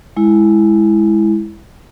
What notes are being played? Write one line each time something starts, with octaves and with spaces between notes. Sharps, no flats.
G#3 E4